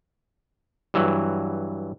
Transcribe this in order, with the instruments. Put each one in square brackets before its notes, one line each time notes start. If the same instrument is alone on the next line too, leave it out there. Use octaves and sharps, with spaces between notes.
[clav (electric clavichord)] G2 E3 F#3